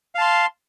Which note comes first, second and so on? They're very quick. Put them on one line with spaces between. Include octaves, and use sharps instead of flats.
F5 A5 C6